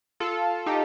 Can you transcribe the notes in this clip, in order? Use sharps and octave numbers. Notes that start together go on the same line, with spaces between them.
F4 A4
D#4 G4